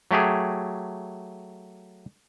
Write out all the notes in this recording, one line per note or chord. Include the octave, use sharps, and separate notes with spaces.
F#3 A3 G4 G#4